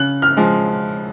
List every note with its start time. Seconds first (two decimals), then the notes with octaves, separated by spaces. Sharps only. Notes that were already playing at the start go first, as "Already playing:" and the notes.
Already playing: C#3 F#6
0.22 F6
0.37 F3 G#3